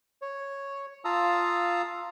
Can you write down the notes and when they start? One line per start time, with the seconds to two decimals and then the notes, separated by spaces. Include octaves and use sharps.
0.22 C#5
1.05 F4 F5 A5 A#5 D#6 E6